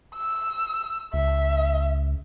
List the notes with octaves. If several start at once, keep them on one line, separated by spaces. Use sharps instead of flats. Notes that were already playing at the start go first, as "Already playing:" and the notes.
E6
C#2 E5